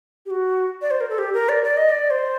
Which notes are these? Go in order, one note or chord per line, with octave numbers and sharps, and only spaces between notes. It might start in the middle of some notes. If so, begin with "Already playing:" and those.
G4
F#4
D5
C5
A#4
A4
G4
A#4
D5
D5
D#5
D5
C5